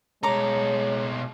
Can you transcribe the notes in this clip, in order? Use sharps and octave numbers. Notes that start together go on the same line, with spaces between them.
B2 G#3 A4 C#5 A#5 D6